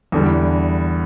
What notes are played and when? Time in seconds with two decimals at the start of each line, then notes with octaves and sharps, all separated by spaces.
0.12 E2 D3 G3